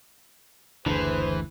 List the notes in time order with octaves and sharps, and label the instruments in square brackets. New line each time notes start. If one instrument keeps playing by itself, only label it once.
[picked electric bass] F#1 D2 D3 [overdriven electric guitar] E3 [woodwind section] G#4 B4 C5